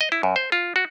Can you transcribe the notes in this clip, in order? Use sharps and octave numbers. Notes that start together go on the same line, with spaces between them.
D#5
E4
F#2
C5
F4
F#4